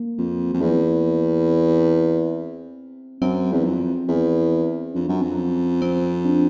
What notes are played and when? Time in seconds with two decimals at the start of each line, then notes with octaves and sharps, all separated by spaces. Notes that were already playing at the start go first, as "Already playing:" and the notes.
Already playing: A#3
0.18 F2
0.53 F2
0.61 E2
1.48 C4
3.21 F#2 C4
3.52 E2
3.65 F2
4.08 E2
4.94 F2 D4
5.09 F#2
5.22 F2
5.38 C#4
5.82 C4
6.25 D4